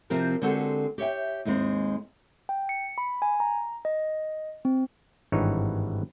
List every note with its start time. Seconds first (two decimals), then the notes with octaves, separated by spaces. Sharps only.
0.10 C3 F3 C4 G4 A#4
0.42 D3 G#3 C4 F#4 G4 A4
0.98 G4 C#5 E5 G5
1.45 D#2 G#2 G#3 C4
2.49 G5
2.69 C#7
2.98 B5
3.22 G#5
3.40 A#5
3.85 D#5
4.65 C4
5.32 G#1 G2 E3 D#4 C#5